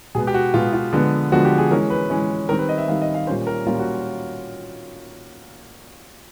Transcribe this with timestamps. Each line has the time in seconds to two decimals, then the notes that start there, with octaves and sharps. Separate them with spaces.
0.15 B2 G#3 B3 G#4
0.27 G4
0.34 F#4
0.54 B2 G#3 B3 F4
0.73 F4
0.93 D3 F3 G#3 B3
1.32 D3 F3 G#3 B3 F#4
1.45 G4
1.58 G#4
1.71 E3 G#3 C#4 A#4
1.90 B4
2.10 E3 G#3 C#4
2.49 D#3 G3 C4 A#4
2.59 B4
2.69 D#5
2.78 E5
2.88 D#3 G3 C4 F5
3.02 D#5
3.14 F5
3.27 A#2 G3 A#3 C#4 C5
3.47 A#4
3.66 A#2 G3 A#3 C#4 F4
3.79 F#4